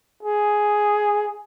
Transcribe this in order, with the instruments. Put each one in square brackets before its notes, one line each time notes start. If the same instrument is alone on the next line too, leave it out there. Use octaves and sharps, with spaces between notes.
[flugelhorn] G#4